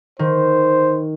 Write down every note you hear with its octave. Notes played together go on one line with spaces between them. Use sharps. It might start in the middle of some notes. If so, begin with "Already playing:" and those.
D#3 C5